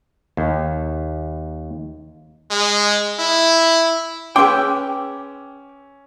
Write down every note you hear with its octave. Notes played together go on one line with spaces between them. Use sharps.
D#2
G#3
E4
C#4 G#4 B4 G5 C6 D6 E6